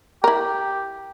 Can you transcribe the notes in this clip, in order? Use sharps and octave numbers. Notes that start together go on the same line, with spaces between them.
E4 G4 A#4